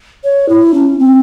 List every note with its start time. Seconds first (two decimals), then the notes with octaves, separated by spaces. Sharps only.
0.24 C#5
0.49 E4
0.74 C#4
0.99 C4